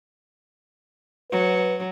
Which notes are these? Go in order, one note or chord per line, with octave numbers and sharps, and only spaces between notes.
F#3 B4